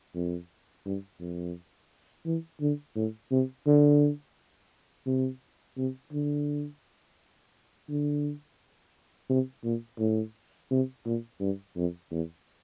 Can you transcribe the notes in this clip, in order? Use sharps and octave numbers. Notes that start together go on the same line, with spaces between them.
F2
G2
F2
E3
D3
A2
C3
D3
C3
C3
D3
D3
C3
A#2
A2
C3
A#2
G2
F2
E2